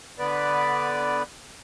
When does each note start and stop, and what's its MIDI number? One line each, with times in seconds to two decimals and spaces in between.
0.19 1.23 50
0.19 1.23 59
0.19 1.23 71
0.19 1.23 74